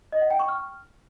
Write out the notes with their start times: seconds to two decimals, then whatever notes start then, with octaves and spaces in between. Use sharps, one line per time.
0.12 D#5
0.21 F#5
0.30 G5
0.39 C#6
0.48 F6